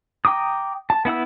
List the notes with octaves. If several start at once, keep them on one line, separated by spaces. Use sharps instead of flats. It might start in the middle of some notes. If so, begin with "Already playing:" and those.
G5 A#5 D6 D#6
A5
B3 E4 F#5 E6